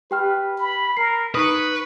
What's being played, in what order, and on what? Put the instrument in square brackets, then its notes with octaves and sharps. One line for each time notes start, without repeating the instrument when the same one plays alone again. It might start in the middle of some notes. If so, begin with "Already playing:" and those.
[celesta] G4 G5 F6 [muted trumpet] B4
[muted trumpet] B5
[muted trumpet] A#4 [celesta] C7
[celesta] D#4 D#6 [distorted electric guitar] B4 [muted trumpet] C#6